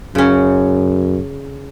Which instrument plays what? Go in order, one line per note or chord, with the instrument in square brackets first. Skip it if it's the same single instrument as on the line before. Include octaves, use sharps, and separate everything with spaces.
[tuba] F#2 [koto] C#3 C#4